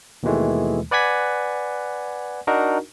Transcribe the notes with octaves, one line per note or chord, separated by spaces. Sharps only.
D#2 B2 D#3 E3 G#3 A3
B4 D5 F#5 G#5 G#6 B6
D4 D#4 F#4 A#4